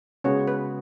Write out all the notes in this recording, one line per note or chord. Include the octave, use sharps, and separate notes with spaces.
C#3 G#3 B3 C#4 F#4 C#5
B4